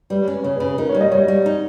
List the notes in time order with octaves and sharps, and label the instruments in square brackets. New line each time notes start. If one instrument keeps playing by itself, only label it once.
[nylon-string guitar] G3 [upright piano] B4
[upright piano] C#5
[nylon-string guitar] C#4
[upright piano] B4
[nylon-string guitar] C#3 [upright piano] C#5
[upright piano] B4
[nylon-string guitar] C#3
[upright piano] B4
[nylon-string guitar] D#4 [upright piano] A#4
[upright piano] C#5
[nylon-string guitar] G3
[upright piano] D#5
[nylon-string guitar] G3 [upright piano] C#5
[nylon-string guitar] G3
D#4